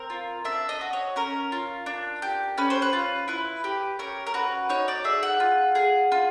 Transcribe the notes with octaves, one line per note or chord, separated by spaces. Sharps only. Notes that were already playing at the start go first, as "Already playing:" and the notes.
Already playing: C4 A#4
F4
D4 E5
D#5
F#4
C#5
C#4 A#4
F4
D4
G4
C#4 B4
C5
B4
F4
E4 B4
G4
C#4 A#4
A#4
F#4 B4
D#4 C#5
D5
G#4 E5
F#5
F4
G#4
F4